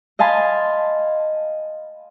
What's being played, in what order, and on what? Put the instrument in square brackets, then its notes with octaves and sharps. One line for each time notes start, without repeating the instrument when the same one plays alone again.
[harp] D#5 F5 G#5 A5 B5 C6